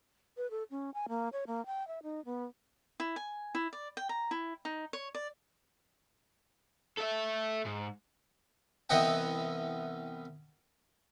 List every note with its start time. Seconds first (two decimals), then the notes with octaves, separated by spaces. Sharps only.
0.37 B4
0.51 A4
0.71 C#4
0.94 G#5
1.09 A#3
1.33 C#5
1.47 A#3
1.66 G5
1.88 E5
2.03 D#4
2.25 B3
3.00 E4
3.16 G#5
3.55 E4
3.73 D5
3.97 G5
4.09 A#5
4.31 E4
4.65 D#4
4.93 C#5
5.15 D5
6.98 A4 E5
7.66 G#2
8.90 C2 E3 B3 D#5 F#5 G5